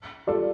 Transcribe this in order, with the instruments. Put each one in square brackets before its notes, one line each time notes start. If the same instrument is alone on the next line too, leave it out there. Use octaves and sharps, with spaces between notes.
[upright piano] G3 F4 A4 [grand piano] D5